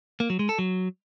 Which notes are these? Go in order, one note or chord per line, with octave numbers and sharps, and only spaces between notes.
A#3
F#3
G#3
A4
F#3